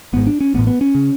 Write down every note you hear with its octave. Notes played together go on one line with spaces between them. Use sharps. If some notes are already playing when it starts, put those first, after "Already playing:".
G#1 G#2 B3
D4
C#4
A1 A2 B3
B3
C#4
C#3